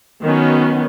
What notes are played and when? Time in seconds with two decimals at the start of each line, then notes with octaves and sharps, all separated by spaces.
0.23 D#3 F#3 B3 C#4